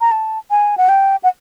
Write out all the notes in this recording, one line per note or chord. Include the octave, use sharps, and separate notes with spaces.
A#5
A5
G#5
F#5
G5
F#5